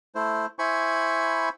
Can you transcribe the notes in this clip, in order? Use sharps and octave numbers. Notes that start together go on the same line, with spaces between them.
A3 E4 C5
E4 C5 G#5 B5 C#6